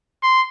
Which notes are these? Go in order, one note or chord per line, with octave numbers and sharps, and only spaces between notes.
C6